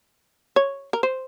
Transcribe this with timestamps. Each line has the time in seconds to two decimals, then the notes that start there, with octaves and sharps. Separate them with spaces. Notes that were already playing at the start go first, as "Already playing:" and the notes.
0.56 C#5
0.93 A#4
1.03 C5